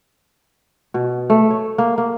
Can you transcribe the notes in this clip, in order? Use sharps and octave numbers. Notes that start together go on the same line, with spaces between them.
B2
A3
C#5
A#3
A#3